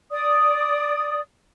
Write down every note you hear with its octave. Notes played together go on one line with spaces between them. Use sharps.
D5 D#6